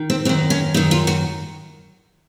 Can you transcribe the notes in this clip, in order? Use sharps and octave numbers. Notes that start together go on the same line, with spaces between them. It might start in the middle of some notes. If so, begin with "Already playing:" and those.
Already playing: D#3
C4
F#2 D#3 C4
C#4
F#2 D#3 D#4
F4
F#4